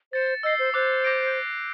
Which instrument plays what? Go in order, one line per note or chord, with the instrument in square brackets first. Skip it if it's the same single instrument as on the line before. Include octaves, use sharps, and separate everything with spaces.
[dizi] C5 [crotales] A6 C#7 E7
[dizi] D#5 [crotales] E6 G6 C7
[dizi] C5
[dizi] C5 [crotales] D6 F#6 A6
[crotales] D6 G6 A#6 D7